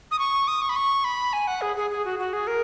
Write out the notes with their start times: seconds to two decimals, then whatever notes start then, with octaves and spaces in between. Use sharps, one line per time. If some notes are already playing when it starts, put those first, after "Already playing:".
0.11 D#6
0.19 C#6
0.48 D#6
0.62 C#6
0.69 B5
0.76 C#6
1.04 B5
1.33 G#5
1.47 F#5
1.62 G#4
1.76 G#4
1.91 G#4
2.05 F#4
2.19 F#4
2.33 G#4
2.47 A#4